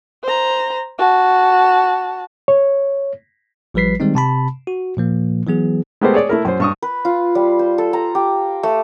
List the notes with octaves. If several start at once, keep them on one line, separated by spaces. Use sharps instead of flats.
C5 A#5
F#4 A5
C#5
A1 F3 G3 B4 B6 C7
D#3 G3 G#3 C4 D#4
C3 A5 B5
F#4
A#2 F3 A#3
E3 F#3 B3 G#4
G#3 A3 B3 G4 A#4 C5
G#4 C#5 D5
A3 E4 A#4
F#2 C5
G2 C#6 D#6
B4
F4
G3
C5
A4
A#5
G4
A3